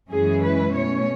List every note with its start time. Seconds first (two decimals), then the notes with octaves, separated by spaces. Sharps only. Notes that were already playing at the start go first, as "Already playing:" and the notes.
0.09 F#2 E3 G#3 C#4 E4 G#4
0.42 B4
0.73 B2 A3 C#4 C#5